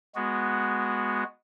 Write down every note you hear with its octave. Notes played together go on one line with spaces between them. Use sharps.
G#3 B3 F#4